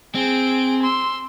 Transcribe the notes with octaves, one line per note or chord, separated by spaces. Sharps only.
C4 G#4 D7
C6 E6